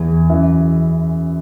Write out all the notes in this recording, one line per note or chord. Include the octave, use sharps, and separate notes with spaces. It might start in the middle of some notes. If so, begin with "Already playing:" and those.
Already playing: E2 E3 G#5
F#2 E3 E5